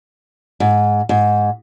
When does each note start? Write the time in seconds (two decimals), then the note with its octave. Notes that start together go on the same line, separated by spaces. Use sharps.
0.60 G#2
1.09 G#2